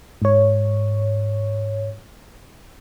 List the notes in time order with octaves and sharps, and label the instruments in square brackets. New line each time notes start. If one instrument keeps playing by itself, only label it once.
[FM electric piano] G#2 C#5